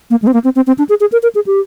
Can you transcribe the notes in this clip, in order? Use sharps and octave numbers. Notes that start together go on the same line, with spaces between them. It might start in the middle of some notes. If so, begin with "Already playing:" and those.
A#3
G#3
C4
A#3
C4
C4
C4
D4
G#4
G#4
A#4
A#4
G#4
G4